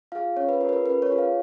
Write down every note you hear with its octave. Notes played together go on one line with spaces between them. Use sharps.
F4 G#4 F5
C#4 C#5
B4
F4 G#4 A#4
B4
A#4
C#4 B4
C#5
F4 G#4
F5